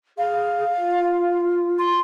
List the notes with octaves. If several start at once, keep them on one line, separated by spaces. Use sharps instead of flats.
G#4 F5
F4
C6